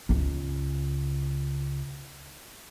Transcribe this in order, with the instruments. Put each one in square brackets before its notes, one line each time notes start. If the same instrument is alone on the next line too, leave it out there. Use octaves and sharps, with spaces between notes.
[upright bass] C#2 C#3